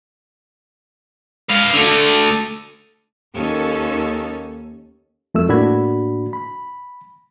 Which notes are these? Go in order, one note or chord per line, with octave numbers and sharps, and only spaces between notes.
B4 F5
D3 A3
D#2 C#4 A4
F2 A3 E6
A2 A#3 D4 F#4 B5 G#6
B5